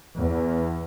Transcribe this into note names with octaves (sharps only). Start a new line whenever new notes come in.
E2